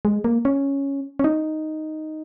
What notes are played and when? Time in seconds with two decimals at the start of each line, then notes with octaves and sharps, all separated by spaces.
0.05 G#3
0.24 A#3
0.45 C#4
1.19 C#4
1.24 D#4